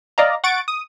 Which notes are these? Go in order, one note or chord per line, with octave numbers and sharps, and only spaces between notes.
D5 D#5 F5 A#5
F#5 C#6 A6 D7
D#6